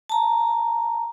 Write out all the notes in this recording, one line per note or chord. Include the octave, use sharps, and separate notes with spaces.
A5 A#5